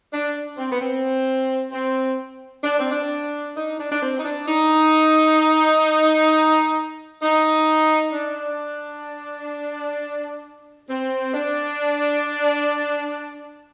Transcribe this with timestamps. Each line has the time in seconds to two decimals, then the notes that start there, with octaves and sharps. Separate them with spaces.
0.12 D4
0.57 C4
0.71 B3
0.80 C4
1.71 C4
2.63 D4
2.77 C4
2.91 D4
3.55 D#4
3.78 D4
3.90 D4
4.01 C4
4.17 D#4
4.23 D4
4.46 D#4
7.21 D#4
8.12 D4
10.88 C4
11.33 D4